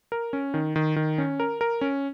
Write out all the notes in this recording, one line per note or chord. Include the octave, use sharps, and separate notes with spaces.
A#4
C#4
D#3
D#3
D#3
C#4
A#4
A#4
C#4